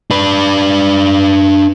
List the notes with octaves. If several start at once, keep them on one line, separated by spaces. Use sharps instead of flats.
D4 B4